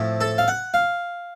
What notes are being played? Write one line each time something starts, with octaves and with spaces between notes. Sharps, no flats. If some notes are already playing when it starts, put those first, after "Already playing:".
Already playing: A2 F3 A3 C4
A4
F5
F#5
F5